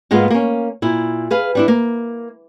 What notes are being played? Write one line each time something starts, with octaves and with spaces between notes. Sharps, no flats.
G#2 G#3 A#3 B3 F4
A#3 C#4
A#2 E4
G#4 B4 F5
G3 D4 E4
A#3